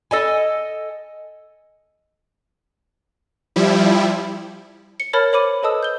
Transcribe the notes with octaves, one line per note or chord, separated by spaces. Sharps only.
A4 D#5 G#5
F3 G3 E4
C#7
A#4 C#5 A5 B5 F6 A6
C5 C#5 B5 D6 D#7
A4 B4 D#5 A5 D#6 E6
G6 G7